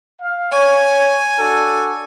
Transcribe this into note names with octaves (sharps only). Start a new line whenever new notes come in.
F5
C#5 G#5
D4 F#4 A4